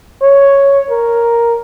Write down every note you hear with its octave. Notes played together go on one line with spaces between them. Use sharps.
C#5
A#4